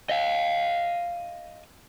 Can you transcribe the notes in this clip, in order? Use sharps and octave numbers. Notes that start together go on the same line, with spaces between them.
D#5 F5